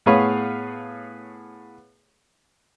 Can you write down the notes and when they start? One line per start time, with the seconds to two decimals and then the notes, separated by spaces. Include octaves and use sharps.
0.06 A2 B3 G#4 B4 C#5 F5